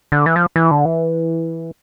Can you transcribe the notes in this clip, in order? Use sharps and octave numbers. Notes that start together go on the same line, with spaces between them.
D3
E3
F3
E3
D3
E3